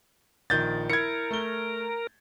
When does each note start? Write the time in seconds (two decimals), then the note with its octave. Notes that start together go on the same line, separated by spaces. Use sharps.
0.50 A#1 D#3 F3 G6 A6
0.90 E4 A#4 G#6 C#7
1.31 A3 G7